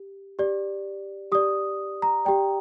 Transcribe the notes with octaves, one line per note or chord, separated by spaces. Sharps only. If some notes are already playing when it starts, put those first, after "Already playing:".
Already playing: G4
G4 D5
G4 D5 D#6
A#5
G4 D5 G5